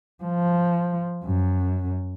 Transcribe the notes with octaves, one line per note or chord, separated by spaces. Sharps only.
F3
F#2